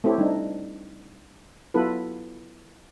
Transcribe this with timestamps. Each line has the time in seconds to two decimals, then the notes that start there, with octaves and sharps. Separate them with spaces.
0.04 A3 C4 E4 G4 C#5
0.18 G3 D4 D#4
1.74 F#3 B3 E4 F4 A4 B4